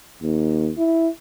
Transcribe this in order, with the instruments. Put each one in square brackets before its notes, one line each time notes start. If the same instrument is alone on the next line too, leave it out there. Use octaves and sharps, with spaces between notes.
[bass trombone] D#2
E4